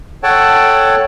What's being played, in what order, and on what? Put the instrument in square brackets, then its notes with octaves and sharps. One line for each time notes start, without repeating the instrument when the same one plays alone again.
[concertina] A4 C#5 F#5 G5 A5